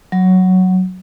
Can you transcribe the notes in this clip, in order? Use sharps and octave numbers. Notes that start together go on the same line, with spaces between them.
F#3